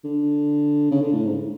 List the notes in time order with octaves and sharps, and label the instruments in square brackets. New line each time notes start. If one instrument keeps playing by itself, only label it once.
[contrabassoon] D3
C#3
D3
A2
G#2